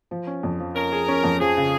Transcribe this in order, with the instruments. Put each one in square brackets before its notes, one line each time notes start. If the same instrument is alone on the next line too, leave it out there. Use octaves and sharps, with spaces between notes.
[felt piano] F3
C#4
F2
F3
[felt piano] C#4 [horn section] A#4
[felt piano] G#4
C#4
F2
[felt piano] F3 [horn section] G#4
[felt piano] C#3